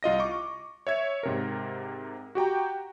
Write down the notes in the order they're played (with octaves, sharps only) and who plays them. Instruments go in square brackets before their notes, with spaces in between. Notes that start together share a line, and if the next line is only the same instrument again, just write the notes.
[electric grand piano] C2 F4 D#5 A#6
C#6 D6
C#5 E5 G#6
G#2 C3 A#4
F#4 G4 G5 A#5